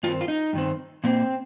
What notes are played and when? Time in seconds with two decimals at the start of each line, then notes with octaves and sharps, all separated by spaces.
0.03 G2 D#3 C4 F4
0.21 F4
0.28 D#4
0.53 G2 D#3 C4
1.04 A#2 A#3 C4